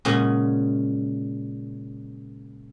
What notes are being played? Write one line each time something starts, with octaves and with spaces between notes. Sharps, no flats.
A#2 C#3 G#3 C#4 F#5